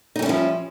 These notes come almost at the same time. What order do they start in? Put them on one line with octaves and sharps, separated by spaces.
D#4 G3 C#4 E4 F3